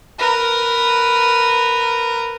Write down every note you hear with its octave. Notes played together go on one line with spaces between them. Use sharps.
A#4 B4